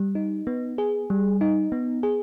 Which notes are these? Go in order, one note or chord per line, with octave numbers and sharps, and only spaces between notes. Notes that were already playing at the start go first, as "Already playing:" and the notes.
Already playing: G3
D#4
B3
G#4
G3
D#4
B3
G#4